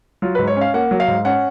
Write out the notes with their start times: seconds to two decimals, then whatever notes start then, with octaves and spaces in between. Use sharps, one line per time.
0.22 F#3 F4
0.35 G#2 B4
0.47 C#5
0.57 C#4 F5
0.74 A#3 F#5
0.91 F#3
1.00 F5
1.08 G#2
1.25 C#4 F#5